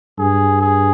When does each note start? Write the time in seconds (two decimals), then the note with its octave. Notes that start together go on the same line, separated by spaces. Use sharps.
0.19 G2 G#4
0.61 G#4